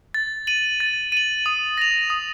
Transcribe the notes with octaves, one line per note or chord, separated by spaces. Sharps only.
A6
D#7 F#7
A6
D#7 F#7
D#6
A#6 F7
D#6